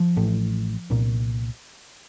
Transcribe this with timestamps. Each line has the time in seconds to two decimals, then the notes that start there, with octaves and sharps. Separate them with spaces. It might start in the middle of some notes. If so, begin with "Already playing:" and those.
Already playing: F3
0.17 A1 A2
0.90 C2 A#2